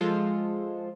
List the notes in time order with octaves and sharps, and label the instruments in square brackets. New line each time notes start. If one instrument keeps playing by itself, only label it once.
[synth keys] F3 G#3 F4 A4 C5